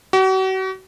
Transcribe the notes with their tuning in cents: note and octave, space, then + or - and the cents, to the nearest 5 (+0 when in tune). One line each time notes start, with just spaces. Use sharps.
F#4 +40